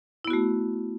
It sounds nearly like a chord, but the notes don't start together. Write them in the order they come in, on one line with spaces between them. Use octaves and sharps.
E4 B3 F#4 A3